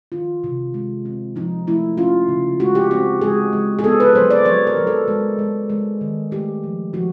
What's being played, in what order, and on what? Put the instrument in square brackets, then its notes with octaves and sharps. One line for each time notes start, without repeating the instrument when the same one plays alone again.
[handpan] D#3 F4
C3
G#3
C4
F3 D#4
A3 E4
C#4 F4
C#3
G#3 F#4
G4
C4 F#4
G#3 G#4
G#3
G#4
B3 A4
B4
F#3 C5
D5
F#3 C#5
A#4
F#3
A4
G#3
G#3
G#3
D#3
A3 G4
F3
F3 F#4